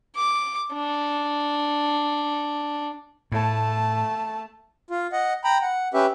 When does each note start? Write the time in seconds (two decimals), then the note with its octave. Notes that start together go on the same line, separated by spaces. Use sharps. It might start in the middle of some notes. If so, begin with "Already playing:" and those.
0.15 D6
0.73 D4
3.32 A2 A3 A5
4.90 F4
5.12 D#5 F#5
5.44 G5 A#5 B5
5.62 F#5
5.94 C#4 G4 B4 E5